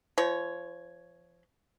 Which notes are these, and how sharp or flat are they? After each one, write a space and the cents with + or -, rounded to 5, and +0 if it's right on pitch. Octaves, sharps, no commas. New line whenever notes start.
F3 -30 C#5 +0